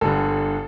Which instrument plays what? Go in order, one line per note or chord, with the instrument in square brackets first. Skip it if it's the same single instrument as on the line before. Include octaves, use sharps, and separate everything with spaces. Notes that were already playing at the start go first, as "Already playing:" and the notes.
[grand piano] G1 G2 D3 A4